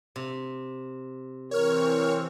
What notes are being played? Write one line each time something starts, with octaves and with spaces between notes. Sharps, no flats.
C3
E3 C4 A#4 C#5 F6